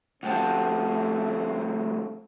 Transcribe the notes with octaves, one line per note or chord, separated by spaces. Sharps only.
D2 F3 A3 C4 F#5 G5 A5